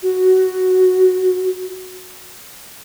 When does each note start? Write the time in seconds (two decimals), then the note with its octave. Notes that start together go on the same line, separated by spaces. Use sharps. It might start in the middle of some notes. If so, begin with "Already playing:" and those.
0.03 F#4